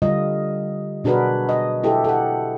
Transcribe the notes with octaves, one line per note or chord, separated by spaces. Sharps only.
D3 G3 F4 D#5
B2 D4 F#4 G#4 A#4 B4
D#5
E4 G4 A4
A4 F#5